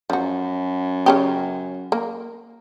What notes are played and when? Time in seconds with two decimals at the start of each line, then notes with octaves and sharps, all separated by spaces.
0.10 F#2 F3 F#4
1.06 C#3 C#4 G4
1.92 A#3